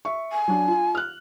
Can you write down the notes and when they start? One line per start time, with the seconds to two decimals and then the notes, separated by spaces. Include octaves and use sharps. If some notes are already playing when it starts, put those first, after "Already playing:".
0.05 E5 C#6
0.32 G#5
0.48 F#3 D4
0.68 F4
0.95 F6 F#6